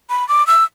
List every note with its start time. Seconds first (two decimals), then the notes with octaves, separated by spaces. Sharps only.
0.10 B5
0.28 D6
0.47 E6